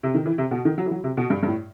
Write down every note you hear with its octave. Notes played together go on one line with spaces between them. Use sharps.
C3
D#3
E3
C3
B2
D#3
F#3
E3
F#3
C3
B2
G2
G2
A2